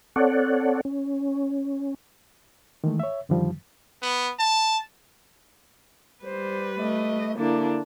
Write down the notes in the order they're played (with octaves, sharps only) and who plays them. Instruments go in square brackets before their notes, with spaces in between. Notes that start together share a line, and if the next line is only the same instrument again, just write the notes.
[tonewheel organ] C4 A4 C#5 D5 F#5
C#4
[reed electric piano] D#3 E3 G#3 A3
C#5 E5
F#2 D3 D#3 F3 G3
[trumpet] B3
A5
[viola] G3 B4 [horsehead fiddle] C5
[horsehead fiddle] A3 D#5
[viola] D3 D4 [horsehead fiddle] A#3 E4